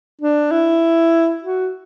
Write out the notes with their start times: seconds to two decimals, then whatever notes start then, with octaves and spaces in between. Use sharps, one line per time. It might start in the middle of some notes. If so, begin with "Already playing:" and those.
0.21 D4
0.51 E4
1.42 F#4